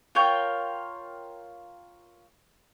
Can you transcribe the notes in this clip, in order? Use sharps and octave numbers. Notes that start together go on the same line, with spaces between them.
F4 A#4 C#5 G5